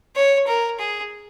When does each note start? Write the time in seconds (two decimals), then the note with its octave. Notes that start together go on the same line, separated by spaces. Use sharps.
0.16 C#5
0.47 A#4
0.79 G#4